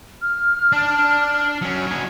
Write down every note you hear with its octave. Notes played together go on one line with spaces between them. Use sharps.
F6
D4 D5
F#3 C#4
F#3 G#4